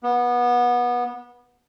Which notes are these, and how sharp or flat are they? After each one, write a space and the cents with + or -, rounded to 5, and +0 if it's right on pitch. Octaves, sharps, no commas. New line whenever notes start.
B3 -20